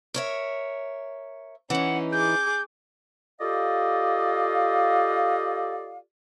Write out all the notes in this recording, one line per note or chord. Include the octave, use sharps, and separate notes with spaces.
A#4 C#5 E5
E3 C#4 D#4 F#5
G#4 D6 G6
F4 G4 A4 D5 D#5 F5